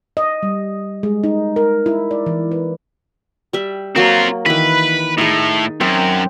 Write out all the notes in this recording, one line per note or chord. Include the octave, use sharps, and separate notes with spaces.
D#5
G3
G#3
D#4
A#4
E4
D5
E3
B4
G3 E5
F#3 A#3 C4 F4
D#3 E3 B4
A2 D#4 G#4
F#2 C4